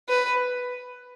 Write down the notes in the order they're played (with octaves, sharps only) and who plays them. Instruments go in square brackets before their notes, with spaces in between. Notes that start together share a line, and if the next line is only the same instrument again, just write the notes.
[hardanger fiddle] B4